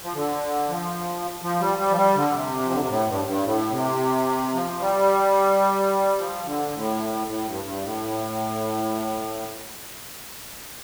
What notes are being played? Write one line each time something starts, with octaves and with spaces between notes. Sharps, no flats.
F3
D3
F3
F3
G3
G3
F3
G3
D3
C3
F3
D3
C3
A2
G2
G2
A2
C3
F3
G3
F3
D3
A2
A2
G2
G2
A2